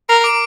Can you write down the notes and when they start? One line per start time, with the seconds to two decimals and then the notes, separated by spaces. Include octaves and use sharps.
0.09 A#4 C7
0.24 D6 D7